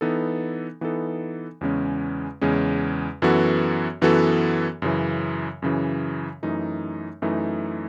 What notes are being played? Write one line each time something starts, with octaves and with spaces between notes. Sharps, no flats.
E3 B3 D#4 A4
E3 B3 D#4 A4
E2 C#3 G#3 C#4
E2 C#3 G#3 C#4
F#2 E3 B3 F#4 A4
F#2 E3 B3 F#4 A4
F#2 C#3 E3
F#2 C#3 E3
F#2 E3 A3 D#4
F#2 E3 A3 D#4